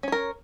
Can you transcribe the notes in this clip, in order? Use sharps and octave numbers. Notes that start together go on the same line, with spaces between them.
C#4 A#4 C#5